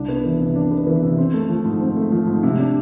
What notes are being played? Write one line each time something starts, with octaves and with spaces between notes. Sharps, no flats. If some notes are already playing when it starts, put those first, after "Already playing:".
Already playing: C2 D4
B3
E3
C3
D4
B3
E3
C3
C4
A3
F3
G#2
C4
A3
F3
G#2
C3
D4